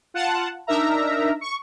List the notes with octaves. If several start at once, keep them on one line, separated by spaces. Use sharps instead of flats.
F4 F#5 A5
D4 D#4 A#4 E5 A#5
C#6